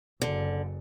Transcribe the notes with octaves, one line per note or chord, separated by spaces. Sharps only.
F#1 D3